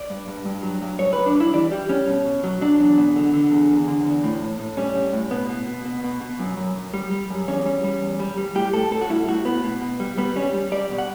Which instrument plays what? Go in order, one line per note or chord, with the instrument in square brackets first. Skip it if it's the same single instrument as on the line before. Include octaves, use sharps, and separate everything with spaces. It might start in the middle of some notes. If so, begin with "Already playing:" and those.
Already playing: [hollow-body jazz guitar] D5
G2
G2
G2
F#3
G2
F#2 C#5
B4
F#2
D4
G3
E4
E3 D5
G3 G4
G3 C#4
B2
B2
F#3
F#3 D4
E2
B2
D3
D3
E2
E2
D3
E2
A2
A2
A2
G3 C#4
A2
A2
B2 B3
B2
B2
B2
B2
B2
F#2
F#2
F#2
G3
G3
F#2
E2 C#4
G3
G3
E2
G3
G3
A2 G4
A2 A4
A2 A4
F#4
G3 E4
A2 F#4
A2 B3
B2
B2
G3
G3 B3
G3 C#4
G3
G3 D5
B2
F#5